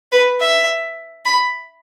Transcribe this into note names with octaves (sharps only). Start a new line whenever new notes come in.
B4
E5
B5